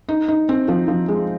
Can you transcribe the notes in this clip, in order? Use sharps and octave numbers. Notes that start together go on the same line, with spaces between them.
D#4
D#4
C4
F3
F3
G#3